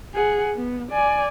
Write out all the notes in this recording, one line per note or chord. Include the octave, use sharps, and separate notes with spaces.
G#4 F#5
B3
D5 G#5